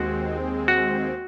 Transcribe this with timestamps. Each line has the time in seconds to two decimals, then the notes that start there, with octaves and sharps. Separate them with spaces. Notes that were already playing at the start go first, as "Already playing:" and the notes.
Already playing: D#2 G#3 C4 F#4
0.68 F#4